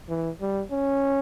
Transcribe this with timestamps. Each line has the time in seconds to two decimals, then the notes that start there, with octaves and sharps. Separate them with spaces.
0.09 E3
0.41 G3
0.71 C#4